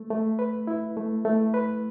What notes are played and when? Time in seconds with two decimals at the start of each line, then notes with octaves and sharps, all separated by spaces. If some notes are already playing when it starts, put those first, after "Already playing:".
Already playing: A3
0.10 A3
0.39 B4
0.67 E4
0.97 A3
1.25 A3
1.54 B4